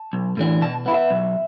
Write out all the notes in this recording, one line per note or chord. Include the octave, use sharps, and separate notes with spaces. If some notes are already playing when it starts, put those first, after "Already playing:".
Already playing: A5
B1
A2 E3 D4
B2 A5
B3 E4
E5
B1